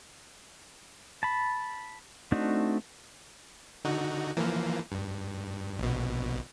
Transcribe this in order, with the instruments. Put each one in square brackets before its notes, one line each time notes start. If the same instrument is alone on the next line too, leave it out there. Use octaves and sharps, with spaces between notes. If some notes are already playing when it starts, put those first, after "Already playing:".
[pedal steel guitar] A5 B5
A3 C4 D4 D#4 F#4
[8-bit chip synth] D3 D#4 F#4
E3 F3 A#3
G2
A#1 B2